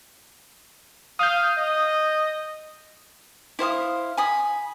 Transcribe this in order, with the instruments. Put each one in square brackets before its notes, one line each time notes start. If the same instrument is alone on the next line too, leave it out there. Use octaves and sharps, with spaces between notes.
[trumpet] F5 [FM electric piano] D#6 G6
[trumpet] D#5
[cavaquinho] E4 C5 F5 D#6
G#5 B5 D#6